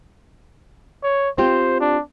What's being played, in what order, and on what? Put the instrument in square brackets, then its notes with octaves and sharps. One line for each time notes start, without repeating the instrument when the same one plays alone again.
[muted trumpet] C#5
[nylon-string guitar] C4 F4 G4 [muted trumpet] C5
[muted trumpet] D4